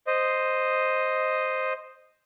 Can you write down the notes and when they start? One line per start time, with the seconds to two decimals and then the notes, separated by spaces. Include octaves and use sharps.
0.07 C5 D#5